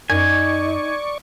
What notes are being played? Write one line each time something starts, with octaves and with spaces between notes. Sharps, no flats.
F#2 D#4 D5 G#5 C#6